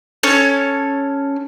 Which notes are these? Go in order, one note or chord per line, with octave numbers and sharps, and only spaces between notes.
C#4 A4 C#5